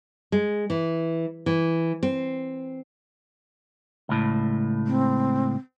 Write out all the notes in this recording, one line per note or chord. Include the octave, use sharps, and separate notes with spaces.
G#3
E3
E3
C4
C#2 A2
C4